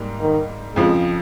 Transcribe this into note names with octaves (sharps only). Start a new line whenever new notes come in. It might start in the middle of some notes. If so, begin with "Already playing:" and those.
Already playing: G#2 G3 A#3
D#3
F2 C#3 F3 G#3